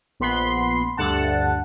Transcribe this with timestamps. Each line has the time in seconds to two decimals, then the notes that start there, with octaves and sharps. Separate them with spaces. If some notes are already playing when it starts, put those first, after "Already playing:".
0.20 A#1 B3 B5 C6
0.97 D2 G2 D3 F#5 A5